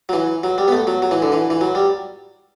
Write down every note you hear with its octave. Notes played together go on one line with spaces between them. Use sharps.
F#3
E3
F#3
G3
B3
A3
F#3
F#3
E3
D3
E3
E3
F#3
G3